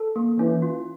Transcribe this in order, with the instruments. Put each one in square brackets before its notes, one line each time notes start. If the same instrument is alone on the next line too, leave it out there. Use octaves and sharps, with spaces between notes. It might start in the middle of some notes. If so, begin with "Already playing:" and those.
Already playing: [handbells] A4
A#3
[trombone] E3 [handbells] C#4
[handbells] F4